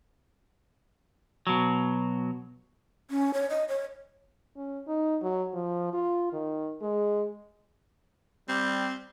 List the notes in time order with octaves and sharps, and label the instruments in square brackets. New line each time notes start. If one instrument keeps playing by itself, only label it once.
[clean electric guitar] B2 F#3
[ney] C#4
C#5
D#5
C#5
[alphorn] C#4
D#4
F#3
F3
F4
D#3
G#3
[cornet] G3 [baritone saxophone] C4